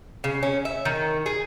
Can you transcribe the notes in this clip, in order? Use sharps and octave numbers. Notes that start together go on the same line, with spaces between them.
C#3
C#4
E5
D#3
G#4